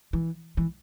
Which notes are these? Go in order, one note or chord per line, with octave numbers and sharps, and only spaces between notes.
E3
E3